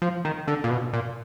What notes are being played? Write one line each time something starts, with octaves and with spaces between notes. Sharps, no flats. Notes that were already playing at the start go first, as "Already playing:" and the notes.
F3
D#3
D3
A#2
B2
A#2